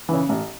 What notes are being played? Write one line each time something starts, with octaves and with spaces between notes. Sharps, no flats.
C#3 E3
A1